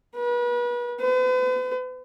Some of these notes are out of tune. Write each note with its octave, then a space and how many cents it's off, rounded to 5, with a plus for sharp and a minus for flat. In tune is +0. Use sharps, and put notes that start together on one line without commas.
B4 -35
B4 +45